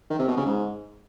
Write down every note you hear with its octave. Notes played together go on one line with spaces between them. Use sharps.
D#3
C3
B2
C#3
G#2